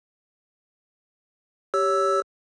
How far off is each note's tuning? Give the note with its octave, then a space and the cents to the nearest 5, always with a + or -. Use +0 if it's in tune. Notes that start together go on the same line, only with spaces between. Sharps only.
G4 +0 C#5 +10 E6 +0